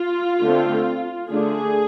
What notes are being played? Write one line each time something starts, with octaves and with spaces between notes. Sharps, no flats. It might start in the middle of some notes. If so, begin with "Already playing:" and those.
Already playing: F4
D3 A3 C4
D3 A3 D4 G#4